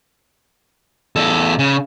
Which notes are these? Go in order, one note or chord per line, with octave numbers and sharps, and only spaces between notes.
E2 A4
C#3